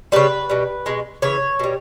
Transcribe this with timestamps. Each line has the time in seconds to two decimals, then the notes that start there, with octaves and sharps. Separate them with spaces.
0.12 C#3 G3 B4
0.50 B2 G3
0.86 B2 G#3
1.22 C#3 E3 C#5
1.59 B2 G3